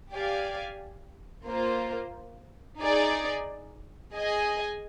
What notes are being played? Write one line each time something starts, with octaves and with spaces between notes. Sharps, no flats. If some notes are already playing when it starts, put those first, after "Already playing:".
G4 D5 F5 G#5
A#3 F4 C5
D#4 G#4 D5
G#4 D#5 G#5